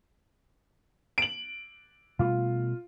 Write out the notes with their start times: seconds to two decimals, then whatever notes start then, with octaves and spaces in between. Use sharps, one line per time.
1.18 D7 F#7
2.19 B2 G3 A3 F4